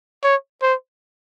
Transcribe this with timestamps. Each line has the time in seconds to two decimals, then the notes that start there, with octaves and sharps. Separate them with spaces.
0.24 C#5
0.62 C5